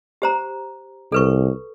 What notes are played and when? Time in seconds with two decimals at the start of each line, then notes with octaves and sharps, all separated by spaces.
0.22 G4 C5 A#5
1.12 C2 A4 B4 C#6